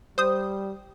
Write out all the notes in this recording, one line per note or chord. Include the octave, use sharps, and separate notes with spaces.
G3 C5 D#6